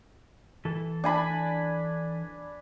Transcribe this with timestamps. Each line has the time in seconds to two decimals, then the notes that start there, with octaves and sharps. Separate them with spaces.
0.65 E3 A4
1.04 D4 G#5 B5